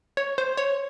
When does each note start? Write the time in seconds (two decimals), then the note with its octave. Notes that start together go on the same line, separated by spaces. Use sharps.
0.17 C#5
0.38 C5
0.57 C#5